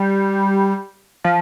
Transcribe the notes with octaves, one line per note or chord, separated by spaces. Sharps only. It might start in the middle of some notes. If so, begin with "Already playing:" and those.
Already playing: G3
F3